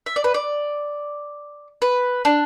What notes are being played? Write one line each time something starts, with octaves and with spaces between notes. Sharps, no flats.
E5
D5
B4
D5
B4
D4